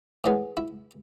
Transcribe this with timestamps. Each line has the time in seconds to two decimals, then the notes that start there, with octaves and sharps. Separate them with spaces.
0.24 A2 E3 G#3 B3
0.57 E4